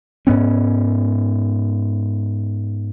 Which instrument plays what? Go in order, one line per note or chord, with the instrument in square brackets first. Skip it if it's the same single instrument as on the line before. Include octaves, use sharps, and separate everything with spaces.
[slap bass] G#2 B3 C#4